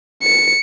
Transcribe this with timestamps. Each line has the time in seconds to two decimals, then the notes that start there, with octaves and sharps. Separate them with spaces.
0.23 C#7